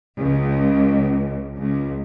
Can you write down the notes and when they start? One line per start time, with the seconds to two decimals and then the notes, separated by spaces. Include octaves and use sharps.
0.19 C#2
1.56 C#2